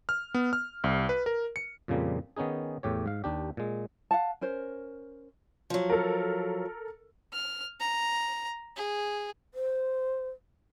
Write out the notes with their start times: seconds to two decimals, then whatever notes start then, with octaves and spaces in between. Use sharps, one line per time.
0.09 F6
0.34 B3
0.53 F6
0.84 C2
1.09 B4
1.26 A#4
1.56 C#7
1.88 F2 A#2 C#3 F3 G3 A#3
2.36 D#3 B3 C#4 D#4 G#4
2.83 E2 A2 G4 C#5
3.06 G#2 F5
3.24 D#2 D4 G4
3.57 A#2 G#3
4.11 F5 F#5 A5
4.41 C#4 A#4 C5
5.70 F3 F#3
5.90 A4 A#4
7.33 F6
7.80 A#5
8.76 G#4
9.54 C5